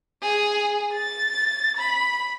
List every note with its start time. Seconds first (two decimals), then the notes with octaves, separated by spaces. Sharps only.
0.22 G#4
0.94 A6
1.77 B5